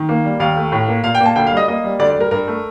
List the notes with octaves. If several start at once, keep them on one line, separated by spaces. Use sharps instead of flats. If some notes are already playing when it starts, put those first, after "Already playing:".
Already playing: D#3
A#3
G3
D#2 F5
A3
A2
A#3
A#2 F5
G5
A#3
A5
D2 G5
F5
G3
D#5
A#3 D#5
G3
D2 D5
D5
G3 A#4
G2 A#4
A3